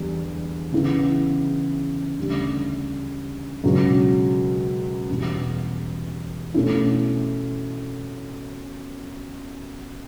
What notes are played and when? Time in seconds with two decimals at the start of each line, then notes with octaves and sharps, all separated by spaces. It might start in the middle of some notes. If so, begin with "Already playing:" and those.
Already playing: E2 D3 G3
0.72 C#3 E3 B3 E4
2.18 D2 C#3 G3
3.64 C#2 B2 F#3
5.10 E2 B2 G3 B3
6.54 B2 A3 C#4 E4